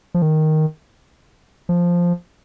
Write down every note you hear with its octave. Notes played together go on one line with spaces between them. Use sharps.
F3
D#3
F3